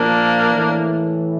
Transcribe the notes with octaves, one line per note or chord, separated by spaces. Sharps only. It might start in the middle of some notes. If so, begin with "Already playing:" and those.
Already playing: A#2 F3 A#3 D4
A2 E3